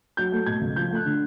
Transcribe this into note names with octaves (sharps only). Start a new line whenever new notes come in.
F#3 G6
A3
B2 G#6
C#2
F3 G6
A3 F#6
D3